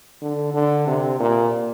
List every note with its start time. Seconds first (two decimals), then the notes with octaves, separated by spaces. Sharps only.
0.21 D3
0.54 D3
0.87 C3
1.19 A#2